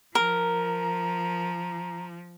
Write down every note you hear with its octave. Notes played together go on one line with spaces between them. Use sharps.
F3 A#4 A#5